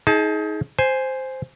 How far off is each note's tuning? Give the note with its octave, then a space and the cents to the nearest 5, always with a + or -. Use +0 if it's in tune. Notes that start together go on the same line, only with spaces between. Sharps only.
D#4 +30 G#4 +25 A5 -15
C5 +0 G#5 +0